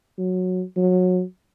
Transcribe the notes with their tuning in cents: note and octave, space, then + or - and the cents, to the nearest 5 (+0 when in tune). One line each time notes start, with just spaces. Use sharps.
F#3 -10
F#3 -25